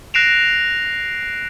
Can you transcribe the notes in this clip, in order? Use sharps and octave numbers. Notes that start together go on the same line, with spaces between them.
F#6 A#6 C7 D7 E7 F7